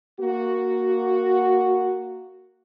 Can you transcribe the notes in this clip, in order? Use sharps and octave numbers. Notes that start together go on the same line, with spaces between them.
A#3 F#4